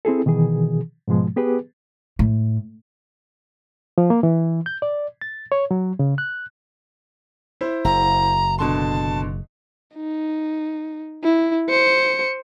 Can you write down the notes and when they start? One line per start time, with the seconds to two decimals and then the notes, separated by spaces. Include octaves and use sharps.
0.05 C4 E4 G#4 A4
0.26 B2 D#3 E3 G#4
1.08 G#2 B2 F3 G#3
1.36 B3 G4 G#4 B4
2.19 A2
3.98 F3
4.10 A#3
4.23 E3
4.66 G6
4.82 D5
5.21 A6
5.52 C#5
5.71 F#3
5.99 C#3
6.18 F#6
7.61 E4 C5
7.84 F#1 A#5
8.59 B2 D3 A5 C6
9.95 D#4
11.24 E4
11.69 C5 C#7